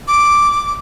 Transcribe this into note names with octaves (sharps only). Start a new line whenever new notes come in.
D6